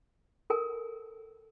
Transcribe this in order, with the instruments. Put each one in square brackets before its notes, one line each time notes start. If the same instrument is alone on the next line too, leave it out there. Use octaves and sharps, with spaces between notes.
[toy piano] A4 A#4 G#5